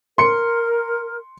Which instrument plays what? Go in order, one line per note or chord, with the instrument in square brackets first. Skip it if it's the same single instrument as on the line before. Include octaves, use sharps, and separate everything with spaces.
[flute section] A#4 [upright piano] C6 C#7